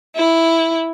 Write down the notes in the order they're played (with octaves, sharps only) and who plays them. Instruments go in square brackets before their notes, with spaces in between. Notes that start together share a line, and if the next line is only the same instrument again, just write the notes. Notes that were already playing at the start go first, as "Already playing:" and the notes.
[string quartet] E4